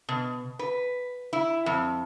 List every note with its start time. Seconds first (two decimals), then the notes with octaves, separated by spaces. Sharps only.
0.09 B2
0.59 B4
1.33 E4
1.66 F2